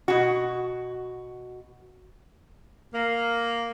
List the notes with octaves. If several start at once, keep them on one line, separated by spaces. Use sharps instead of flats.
B2 F#4
A#3